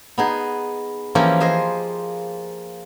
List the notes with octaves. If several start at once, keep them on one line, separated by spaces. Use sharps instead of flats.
B3 D#4 G#4
E3 F3 A#3 C#4 G4
G#4 C5 D#5